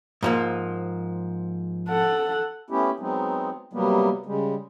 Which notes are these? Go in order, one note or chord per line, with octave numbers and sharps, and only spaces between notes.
G#2 F3 A#3
A4 F#5
A3 B3 C#4 E4 G4
F#3 G#3 B3 C4 D#4
C3 F#3 G3 A#3 B3
C#3 G3 G#3